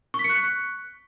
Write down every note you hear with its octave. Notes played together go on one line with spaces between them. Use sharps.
C#6
B6
C#7
F#6